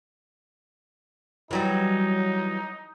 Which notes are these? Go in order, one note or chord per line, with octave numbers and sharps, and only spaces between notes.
E3 F#3 G3 D#4